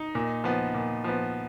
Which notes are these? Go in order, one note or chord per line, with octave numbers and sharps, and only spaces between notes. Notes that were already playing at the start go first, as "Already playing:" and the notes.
Already playing: D#4
A#2
F3 B3
A#2
F3 B3